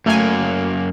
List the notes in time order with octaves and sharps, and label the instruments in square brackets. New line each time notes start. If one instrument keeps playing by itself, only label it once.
[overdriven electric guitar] F#2 A#3 [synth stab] A3 G#5